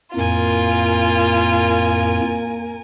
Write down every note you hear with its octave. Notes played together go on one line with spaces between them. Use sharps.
F2 A2 A#3 F4 A#4 G#5